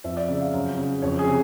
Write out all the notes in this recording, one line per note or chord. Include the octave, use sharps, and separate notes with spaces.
F2 E5
D5
C#3 E5
F5
F#2
C#3
F2 C#5
G#4
C3